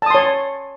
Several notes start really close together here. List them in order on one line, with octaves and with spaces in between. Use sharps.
A5 D#6 C6 C#5